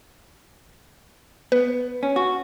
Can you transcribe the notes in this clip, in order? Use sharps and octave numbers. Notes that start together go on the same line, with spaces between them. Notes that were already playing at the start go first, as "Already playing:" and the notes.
B3 B4
C#4
F#4